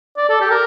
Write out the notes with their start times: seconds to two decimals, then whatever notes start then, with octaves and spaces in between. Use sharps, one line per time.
0.17 D5
0.29 A4
0.41 G4
0.51 A#4